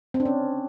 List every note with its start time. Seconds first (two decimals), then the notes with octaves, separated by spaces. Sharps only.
0.14 C4
0.20 D4
0.25 C#4